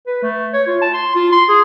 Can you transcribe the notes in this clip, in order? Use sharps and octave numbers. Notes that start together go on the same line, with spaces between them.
B4
A3
C#5
F4
A5
C6
F4
C6
G#4